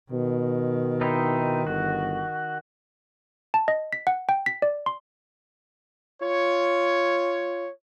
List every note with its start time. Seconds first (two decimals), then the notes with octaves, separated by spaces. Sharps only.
0.12 B2 D#3
1.01 C4 D#4 E4
1.67 G1 F#4
3.54 A5
3.68 D#5
3.93 B6
4.07 F#5
4.29 G5
4.46 B6
4.62 D5
4.86 C6
6.22 F4 C#5